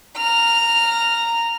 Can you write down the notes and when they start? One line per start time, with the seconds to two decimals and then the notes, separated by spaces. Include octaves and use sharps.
0.17 A#5 F6